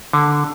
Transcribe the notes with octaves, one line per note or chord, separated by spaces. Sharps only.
D3